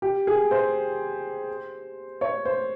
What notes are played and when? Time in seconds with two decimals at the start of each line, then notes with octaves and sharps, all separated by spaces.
0.02 G4
0.27 G#4
0.51 C5
2.21 C#5
2.45 C5